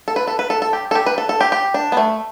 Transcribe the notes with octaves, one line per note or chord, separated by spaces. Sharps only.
A4
B4
A4
B4
A4
A4
G4
A4
G4
B4
A4
A4
G4
G4
D4
B3
A3